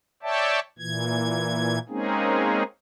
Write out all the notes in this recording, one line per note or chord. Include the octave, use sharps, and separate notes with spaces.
C#5 D5 E5 G5 A5
A#2 E3 G#6
G#3 A#3 C4 C#4 D#4 G#4